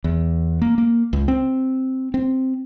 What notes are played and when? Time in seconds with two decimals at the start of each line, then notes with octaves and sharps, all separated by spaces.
0.04 E2
0.62 A#3
0.78 A#3
1.13 C#2
1.28 C4
2.14 C4